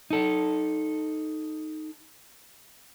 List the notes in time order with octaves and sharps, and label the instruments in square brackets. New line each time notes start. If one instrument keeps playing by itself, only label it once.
[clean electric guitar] D#4 A4